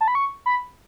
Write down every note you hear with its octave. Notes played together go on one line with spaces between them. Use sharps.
A5
B5
C#6
B5